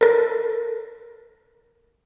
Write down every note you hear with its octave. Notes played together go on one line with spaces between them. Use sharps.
A4 A#4